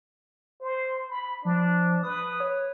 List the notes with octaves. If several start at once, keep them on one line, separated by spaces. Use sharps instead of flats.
C5
B5
F3 D4
B4 D#6
C#5